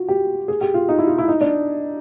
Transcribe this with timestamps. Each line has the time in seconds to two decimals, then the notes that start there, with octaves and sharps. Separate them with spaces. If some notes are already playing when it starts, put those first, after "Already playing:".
Already playing: F4 F#4
0.09 G4
0.48 G#4
0.61 G4
0.74 F4
0.89 D#4
0.99 E4
1.07 F4
1.18 E4
1.28 D#4
1.41 D4